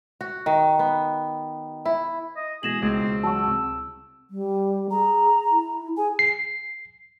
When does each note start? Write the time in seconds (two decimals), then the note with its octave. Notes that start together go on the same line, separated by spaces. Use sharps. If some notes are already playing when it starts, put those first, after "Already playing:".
0.21 F#4
0.46 D#3
0.79 B3
1.85 E4
2.36 D#5
2.63 B2 E3 G#3 G#4 A#6 E7 F#7
2.82 C#2 C4
3.24 F#3 F#5 A5 C#6 E6
3.47 C2
4.30 G3
4.91 G#4 A#5
5.51 E4
5.97 G#4 G#5
6.19 C7